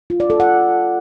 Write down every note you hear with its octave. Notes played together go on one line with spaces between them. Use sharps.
F4
D5
A4
F#5